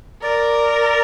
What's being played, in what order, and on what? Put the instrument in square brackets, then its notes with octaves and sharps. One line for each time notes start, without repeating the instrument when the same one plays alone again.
[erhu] A#4 [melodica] D5